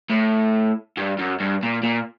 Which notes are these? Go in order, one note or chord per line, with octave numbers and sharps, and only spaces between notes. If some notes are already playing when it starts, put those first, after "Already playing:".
A2
G2
F#2
G2
A#2
A#2